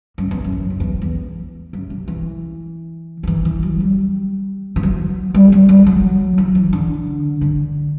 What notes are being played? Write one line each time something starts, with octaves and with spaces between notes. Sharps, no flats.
F#2
E2
F#2
F#2
E2
E2
F#2
C3
E3
D3
E3
E3
F#3
G3
E3
F#3
G3
G3
G3
F#3
E3
E3
D3
D3